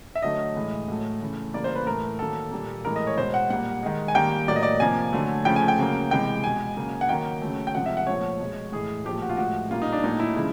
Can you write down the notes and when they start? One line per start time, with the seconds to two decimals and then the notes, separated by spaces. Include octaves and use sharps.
0.15 E5
0.22 D3 F#3 A3 D#5
0.55 A2 E3 G#3
0.88 A2 F#3 A3
1.21 C#3 E3 A3
1.54 C#3 E3 G3 A#3 D5
1.64 C5
1.75 B4
1.86 A2 E3 A3 A#4
2.19 D#3 F#3 A#3 A4
2.51 A#2 G3 A#3
2.85 A2 E3 G#3 A#4
2.96 D#5
3.07 C#5
3.17 B2 G#3 C5
3.34 F#5
3.50 A#2 G3 A#3 F#5
3.83 D#3 G#3
4.08 G#5
4.15 D#3 G3 A#3 G5
4.48 A2 F#3 A#3 D5
4.56 D#5
4.63 D5
4.80 C3 F3 A#3 G#5
5.13 D3 F#3 A3
5.45 C#3 F3 A3 G5
5.56 G#5
5.68 G5
5.79 C#3 F#3 A#3
6.11 C3 E3 G#3 G5
6.44 B2 G#3 G#5
6.77 C#3 F#3 A#3
7.01 F#5
7.09 D#3 F#3 A#3 G5
7.42 C#3 F#3 A3
7.67 G5
7.75 C3 F3 G#3 F#5
7.86 E5
7.97 F#5
8.07 A#2 F3 A3 C#5
8.40 B2 G#3
8.72 A2 E3 G#3 G#4
9.05 A#2 F3 A3 G4
9.22 F#4
9.29 F4
9.37 A2 F3 G#3 F#4
9.71 A#2 G3 A#3 F4
9.82 D#4
9.92 D4
10.04 A#2 F#3 A3 D#4
10.20 E4
10.36 C#3 F3 G#3